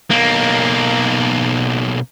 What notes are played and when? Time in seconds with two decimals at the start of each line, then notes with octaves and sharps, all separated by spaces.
0.11 B1 A#3